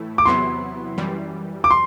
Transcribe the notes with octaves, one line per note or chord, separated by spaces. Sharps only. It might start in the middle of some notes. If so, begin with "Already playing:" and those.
Already playing: A2 E3 A3 E4
D6
E2 C3 F#3 B3 E4 C6
F#2 E3 G3
D6
C6